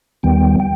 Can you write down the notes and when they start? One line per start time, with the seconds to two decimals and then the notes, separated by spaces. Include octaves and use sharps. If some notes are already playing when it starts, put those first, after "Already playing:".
0.23 D#2 D#3 G3 B3 G5
0.60 G5